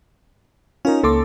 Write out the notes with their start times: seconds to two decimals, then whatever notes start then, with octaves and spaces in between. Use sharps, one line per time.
0.85 C#4 D#4 F4 A#4
1.03 C#2 A#3 A4 A5 C6 D6